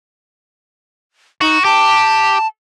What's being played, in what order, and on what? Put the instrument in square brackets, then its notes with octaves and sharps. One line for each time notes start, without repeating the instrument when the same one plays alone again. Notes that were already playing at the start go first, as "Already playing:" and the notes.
[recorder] D#4 [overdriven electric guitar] F#4
[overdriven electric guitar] G4 [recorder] A5